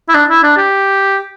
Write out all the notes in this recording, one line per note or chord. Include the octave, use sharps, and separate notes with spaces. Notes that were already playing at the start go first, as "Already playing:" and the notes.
E4
D4
E4
D4
G4